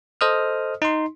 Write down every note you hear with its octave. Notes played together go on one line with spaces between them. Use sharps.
A4 C5 D#5 D#6 F6
D#4 C6